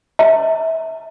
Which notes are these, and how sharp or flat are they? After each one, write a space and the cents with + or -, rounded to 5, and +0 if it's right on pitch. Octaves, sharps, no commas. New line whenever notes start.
E5 -30 A#5 -35